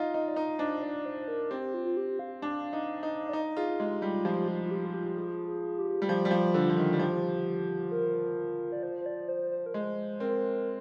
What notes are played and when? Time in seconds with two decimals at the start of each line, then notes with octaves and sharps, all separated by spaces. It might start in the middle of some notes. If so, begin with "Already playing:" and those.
Already playing: D#4 F4
0.14 D#4 D#5
0.28 D5
0.36 D#4 D#5
0.59 D4 C5
0.83 D5
1.06 C5
1.28 A#4
1.51 C4 G4
1.74 F4
1.85 F4
1.97 G4
2.19 F5
2.42 D4
2.73 D#4
3.03 D#4
3.29 D5
3.33 D#4 D#5
3.57 F4 G#4
3.80 G#3 G4
4.02 G3 F4
4.25 F3 G4
4.48 F4
4.64 F4
4.71 G4
4.85 F4
4.94 G4
5.17 G#4
5.48 G#4
5.79 G4
6.02 G3
6.09 F3 G4
6.25 G3
6.31 F3
6.54 D3 F4
6.70 F3
6.77 D#3
6.93 G3
6.99 F3 G4
7.92 A#4
8.72 D5
8.83 C5
9.01 C5
9.06 D5
9.29 C5
9.51 C5
9.66 A#4
9.74 G#3 C5
10.20 C4 A#4